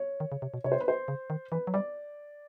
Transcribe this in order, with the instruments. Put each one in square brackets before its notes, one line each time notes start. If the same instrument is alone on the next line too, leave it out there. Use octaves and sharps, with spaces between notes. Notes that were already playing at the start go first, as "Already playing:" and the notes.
Already playing: [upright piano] C#5
[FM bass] D#3
C#3
C3
B2
[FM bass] C3 [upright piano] C#5
[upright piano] C5
B4
C5
[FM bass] C#3
D#3
[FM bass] E3 [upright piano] B4
[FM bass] F#3
[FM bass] G3 [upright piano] D5